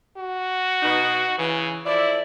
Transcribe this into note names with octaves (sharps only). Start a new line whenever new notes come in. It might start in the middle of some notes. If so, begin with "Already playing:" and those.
F#4
B2 D#4
C#3 E3
F3 E4 A4 D5